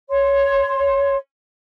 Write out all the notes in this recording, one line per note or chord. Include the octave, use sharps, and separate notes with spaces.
C#5 C6